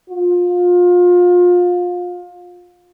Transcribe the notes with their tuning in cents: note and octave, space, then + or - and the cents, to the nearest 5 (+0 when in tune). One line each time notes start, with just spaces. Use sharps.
F4 +25